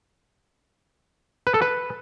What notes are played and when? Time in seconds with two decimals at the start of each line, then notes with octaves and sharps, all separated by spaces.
1.47 B4
1.54 A4
1.62 B4